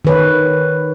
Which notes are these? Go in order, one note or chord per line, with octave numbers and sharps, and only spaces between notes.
D#3 B4 C#5